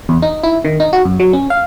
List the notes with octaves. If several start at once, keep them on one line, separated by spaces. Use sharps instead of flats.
E2
D#4
E4
D#3
D#4
F#4
F#2
F#3
C#4
F5